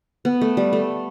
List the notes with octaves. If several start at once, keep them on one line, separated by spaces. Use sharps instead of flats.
B3
A3
G3
A3